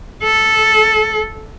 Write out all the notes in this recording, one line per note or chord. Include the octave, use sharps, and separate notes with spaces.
A4